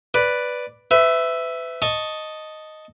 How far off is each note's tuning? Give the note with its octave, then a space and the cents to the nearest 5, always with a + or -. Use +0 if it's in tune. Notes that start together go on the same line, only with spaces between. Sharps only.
B4 +0 D5 +0
B4 +35 E5 +0
D#5 +0 A5 +0 C#6 -5